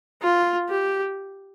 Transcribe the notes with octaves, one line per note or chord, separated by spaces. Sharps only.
F4
G4